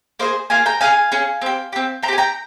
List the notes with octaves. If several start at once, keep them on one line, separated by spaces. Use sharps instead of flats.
A#3 F4 G#4 C5 D#5
A#3 F4 G#4 F5 G#5
G5 A#5
C#4 G#4 F5 G#5
C#4 G#4
C4 G4
C4 G4
C4 G5 A#5
G4 G#5
G5 A#5